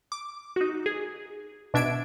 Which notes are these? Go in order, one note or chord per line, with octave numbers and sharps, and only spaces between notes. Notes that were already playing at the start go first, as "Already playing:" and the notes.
D6
D#4 F#4
G#4
B2 D4 E5 G#6 D7